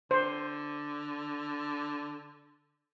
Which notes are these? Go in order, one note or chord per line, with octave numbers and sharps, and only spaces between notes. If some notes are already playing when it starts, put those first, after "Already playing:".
D3 C5